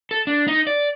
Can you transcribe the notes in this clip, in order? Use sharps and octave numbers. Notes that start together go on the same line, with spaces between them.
A4
D4
D#4
D5